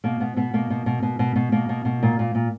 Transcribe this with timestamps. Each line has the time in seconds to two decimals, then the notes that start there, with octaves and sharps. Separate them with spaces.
0.04 B2 A#3
0.20 B2 B3
0.36 B2 B3
0.54 B2 A#3
0.70 B2
0.86 B2
1.03 B2
1.19 B2
1.36 B2
1.52 B2 A#3
1.69 B2
1.85 B2
2.03 A#2
2.19 A#2
2.35 A#2